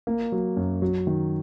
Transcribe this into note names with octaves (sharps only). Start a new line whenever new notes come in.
A#3
F#3
F#2
F#3
D#3